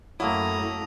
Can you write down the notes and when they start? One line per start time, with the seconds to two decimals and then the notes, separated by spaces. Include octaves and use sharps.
0.20 F#2 A2 F#3 A#3 E4 A4 A#5 D#6